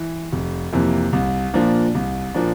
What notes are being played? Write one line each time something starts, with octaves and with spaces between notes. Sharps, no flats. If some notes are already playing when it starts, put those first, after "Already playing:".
Already playing: E3
F1
F2 C3 E3 A#3
C2
A#2 F3 A#3 D4
C2
A#2 F3 A#3 D4